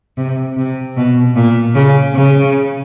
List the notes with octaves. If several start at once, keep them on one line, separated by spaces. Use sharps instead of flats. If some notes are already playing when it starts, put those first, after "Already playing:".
C3
C3
B2
A#2
C#3
C#3